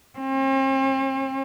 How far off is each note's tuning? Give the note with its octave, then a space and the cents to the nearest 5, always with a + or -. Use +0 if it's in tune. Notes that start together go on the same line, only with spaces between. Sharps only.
C4 +45